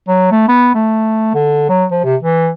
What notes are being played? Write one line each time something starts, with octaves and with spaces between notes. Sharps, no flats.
F#3
A3
B3
A3
D3
F#3
F3
C3
E3